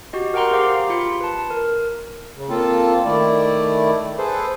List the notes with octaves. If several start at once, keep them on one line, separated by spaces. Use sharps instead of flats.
F#4 G4 D#5
A#4 F#5 G5 A#5 C6
G4 G#4 C5 F5 D6 C7
F4 B5 C6 C#7
B4 A5
A#4
C#3
A#3 C4 F4 A4 A5
D#3 A3 E4 D5
G#4 A4 B4 C5